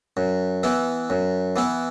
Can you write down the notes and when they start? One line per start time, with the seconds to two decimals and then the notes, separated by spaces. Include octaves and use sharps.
0.17 F#2
0.63 E3 B3 E4
1.10 F#2
1.56 E3 B3 E4